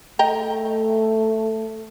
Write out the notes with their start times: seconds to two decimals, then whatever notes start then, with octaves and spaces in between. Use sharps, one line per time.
0.19 A3 D#5 G5 A#5